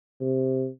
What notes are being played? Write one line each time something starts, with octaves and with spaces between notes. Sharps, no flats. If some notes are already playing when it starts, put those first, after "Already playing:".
C3